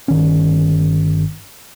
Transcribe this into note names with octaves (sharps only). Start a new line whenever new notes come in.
G1 D#3 C#4